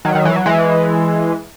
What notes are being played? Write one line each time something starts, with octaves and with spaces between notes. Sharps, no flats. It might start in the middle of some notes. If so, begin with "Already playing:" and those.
D#3 F#3
D#3
E3
F#3
E3 G#3